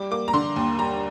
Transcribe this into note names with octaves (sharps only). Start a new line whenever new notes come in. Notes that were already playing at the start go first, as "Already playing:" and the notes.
Already playing: G3 D6
A#3 D6
A#5
D3 C6
D#2
G3 A#5